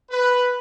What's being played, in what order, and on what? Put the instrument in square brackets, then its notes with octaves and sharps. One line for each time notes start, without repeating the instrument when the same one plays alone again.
[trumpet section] B4